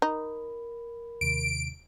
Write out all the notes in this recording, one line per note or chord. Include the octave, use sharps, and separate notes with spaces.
D#4 A#4 B5
D#2 C3 D#3 D7